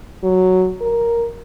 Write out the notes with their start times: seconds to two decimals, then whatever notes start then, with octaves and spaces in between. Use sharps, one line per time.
0.23 F#3
0.81 A#4